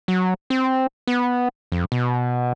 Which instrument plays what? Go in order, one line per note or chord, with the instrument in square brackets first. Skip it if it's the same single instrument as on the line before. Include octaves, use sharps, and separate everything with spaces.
[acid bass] F#3
C4
B3
F2
B2